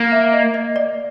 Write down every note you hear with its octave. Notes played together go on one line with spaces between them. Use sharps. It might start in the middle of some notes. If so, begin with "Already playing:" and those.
Already playing: A#3
E5
D#5
D#5
D5